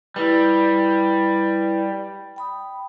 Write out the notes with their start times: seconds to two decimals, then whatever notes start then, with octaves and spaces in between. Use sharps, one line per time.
0.16 G3 E4 B4
2.36 G5 B5 D#6